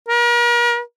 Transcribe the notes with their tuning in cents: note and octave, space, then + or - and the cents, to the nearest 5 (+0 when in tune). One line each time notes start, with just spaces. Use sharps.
A#4 +40